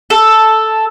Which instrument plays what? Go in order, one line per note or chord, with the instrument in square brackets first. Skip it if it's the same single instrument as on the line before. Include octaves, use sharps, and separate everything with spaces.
[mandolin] A4